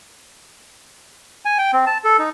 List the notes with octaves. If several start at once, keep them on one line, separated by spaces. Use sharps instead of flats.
G#5
G5
C4
A5
A4
D#4